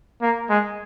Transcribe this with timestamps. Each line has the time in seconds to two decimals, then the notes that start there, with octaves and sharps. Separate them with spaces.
0.22 A#3
0.49 G#3